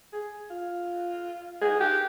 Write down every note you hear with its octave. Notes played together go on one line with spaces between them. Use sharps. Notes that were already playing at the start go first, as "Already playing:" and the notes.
G#4
F4
G#4
G4